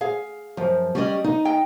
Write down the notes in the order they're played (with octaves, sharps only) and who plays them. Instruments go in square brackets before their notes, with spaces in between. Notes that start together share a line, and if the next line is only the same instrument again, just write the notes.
[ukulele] G#4 [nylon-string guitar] F5
[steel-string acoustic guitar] F#2 [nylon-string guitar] F3
[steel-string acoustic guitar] G3 D5 D#5 [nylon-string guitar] C#4 G4
[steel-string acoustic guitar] D#4 [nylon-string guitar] D#5
[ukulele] G5